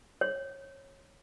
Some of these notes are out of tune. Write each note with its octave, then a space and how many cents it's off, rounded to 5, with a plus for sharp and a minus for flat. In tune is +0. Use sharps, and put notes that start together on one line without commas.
C#5 -20